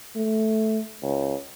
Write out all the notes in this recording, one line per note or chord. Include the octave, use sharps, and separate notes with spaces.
A3
C#2